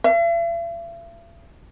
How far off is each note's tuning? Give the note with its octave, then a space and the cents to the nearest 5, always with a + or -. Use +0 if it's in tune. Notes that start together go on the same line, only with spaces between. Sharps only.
E5 +45